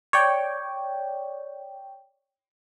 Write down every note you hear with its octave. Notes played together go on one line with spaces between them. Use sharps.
C#5 D5 G5